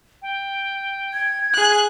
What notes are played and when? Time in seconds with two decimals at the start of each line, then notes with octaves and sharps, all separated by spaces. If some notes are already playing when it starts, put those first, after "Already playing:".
0.22 G5
1.13 G#6
1.53 G#4 F#6